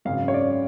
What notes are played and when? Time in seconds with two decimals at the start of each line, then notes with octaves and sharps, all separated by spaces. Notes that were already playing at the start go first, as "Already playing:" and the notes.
0.05 G#1 F#2 C#3 F5
0.28 C#5
0.34 D5